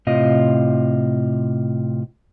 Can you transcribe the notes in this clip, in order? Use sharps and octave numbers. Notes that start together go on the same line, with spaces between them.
A2 C3 F4 D#5